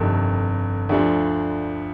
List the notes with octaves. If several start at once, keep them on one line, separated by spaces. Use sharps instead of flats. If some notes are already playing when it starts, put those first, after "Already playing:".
Already playing: G1 F2 C3 D#3 A4
D2 D3 F3